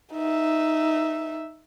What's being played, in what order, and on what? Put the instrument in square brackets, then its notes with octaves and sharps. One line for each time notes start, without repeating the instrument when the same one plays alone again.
[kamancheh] D#4 E5